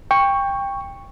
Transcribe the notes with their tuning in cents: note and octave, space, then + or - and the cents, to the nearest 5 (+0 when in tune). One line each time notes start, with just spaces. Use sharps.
G5 +20 C#6 +0